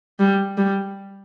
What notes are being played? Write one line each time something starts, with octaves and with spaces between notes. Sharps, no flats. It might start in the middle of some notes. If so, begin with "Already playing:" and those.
G3
G3